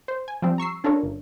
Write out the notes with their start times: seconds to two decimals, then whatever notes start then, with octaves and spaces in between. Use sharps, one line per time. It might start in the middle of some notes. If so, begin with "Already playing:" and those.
0.08 C5
0.28 G#5
0.42 F3 G3 C4
0.58 A#5 C#6 E6 C7
0.84 C#4 D4 F4 A4 A#4 C#5
1.03 G1